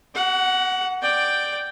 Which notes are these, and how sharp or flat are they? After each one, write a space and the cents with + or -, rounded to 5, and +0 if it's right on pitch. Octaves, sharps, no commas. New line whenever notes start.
F#4 +35 F#5 +0
D5 +10 G5 +0